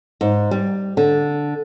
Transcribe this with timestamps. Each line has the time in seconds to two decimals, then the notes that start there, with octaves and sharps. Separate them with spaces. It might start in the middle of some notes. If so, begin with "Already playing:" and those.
0.21 G#2
0.51 G3
0.97 D3